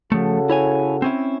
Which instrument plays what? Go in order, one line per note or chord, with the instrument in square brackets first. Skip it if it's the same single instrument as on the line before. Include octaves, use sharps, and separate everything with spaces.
[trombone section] C#3 F#4 A4 [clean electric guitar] F3 A3
[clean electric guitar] E4 C#5 G#5
C4 C#4 E4